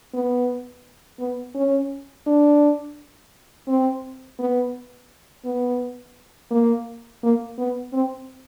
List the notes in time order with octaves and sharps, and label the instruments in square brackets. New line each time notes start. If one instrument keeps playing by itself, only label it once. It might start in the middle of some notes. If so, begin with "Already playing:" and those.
[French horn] B3
B3
C#4
D4
C4
B3
B3
A#3
A#3
B3
C4